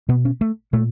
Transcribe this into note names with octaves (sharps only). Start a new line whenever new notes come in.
B2 B3
C#4
A3
A#2 A3